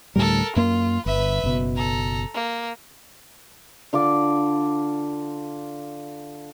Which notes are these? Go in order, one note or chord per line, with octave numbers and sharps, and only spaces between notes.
D2 A2 G3 A4 A#4
F#2 A#3 F4
G1 B4 E5
F#1 B2
A4 A#5
A#3
D3 F4 D5 D6